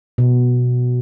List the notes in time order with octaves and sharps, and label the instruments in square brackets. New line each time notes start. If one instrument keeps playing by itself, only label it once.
[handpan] B2